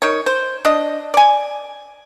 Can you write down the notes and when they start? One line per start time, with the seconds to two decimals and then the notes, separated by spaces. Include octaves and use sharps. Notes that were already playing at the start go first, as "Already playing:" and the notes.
0.02 D#3 C#5
0.26 C5
0.65 D4 D#5
1.14 D5 G#5